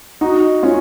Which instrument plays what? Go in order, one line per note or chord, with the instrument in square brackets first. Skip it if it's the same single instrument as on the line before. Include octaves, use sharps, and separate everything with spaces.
[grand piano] D#4 F#4
C#4 F4